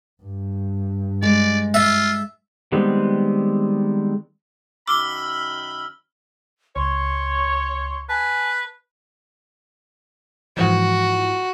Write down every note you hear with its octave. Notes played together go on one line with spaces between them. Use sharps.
G2
G#3 D5
F4 E5
D#3 G3 G#3 B3 C4
F#2 D#3 B5 D6 E6 F6 G7
C#2 C#5 C6
B4 G#5 A5
G#2 E3 F3 F#4